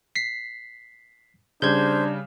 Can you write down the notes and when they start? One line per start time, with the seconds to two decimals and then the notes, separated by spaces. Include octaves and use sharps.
0.16 B6 C7
1.62 C#3 G3 D4 C5 G6 G#6